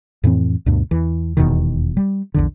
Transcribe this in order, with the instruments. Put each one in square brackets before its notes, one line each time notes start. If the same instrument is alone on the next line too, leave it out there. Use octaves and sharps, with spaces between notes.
[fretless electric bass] F2 A2 E3 C4
D2 G2 B2
E2 E3
D#1 E2 B2 D#3
G3
A#1 E2 D3